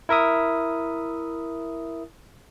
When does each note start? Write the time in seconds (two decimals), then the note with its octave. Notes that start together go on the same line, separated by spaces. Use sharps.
0.09 E4 A#4 E5 D#6